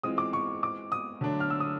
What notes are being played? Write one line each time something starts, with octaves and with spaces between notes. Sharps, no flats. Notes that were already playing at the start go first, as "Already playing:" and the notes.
E3 G#3 C4 F4 D#6
D6
C#6
D6
D#6
D3 F#3 A3 D4
F6
E6
D#6